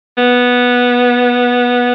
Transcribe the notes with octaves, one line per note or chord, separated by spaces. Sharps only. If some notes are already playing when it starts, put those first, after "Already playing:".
B3